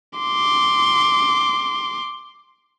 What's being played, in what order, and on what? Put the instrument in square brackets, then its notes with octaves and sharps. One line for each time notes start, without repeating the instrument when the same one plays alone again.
[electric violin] C6 D6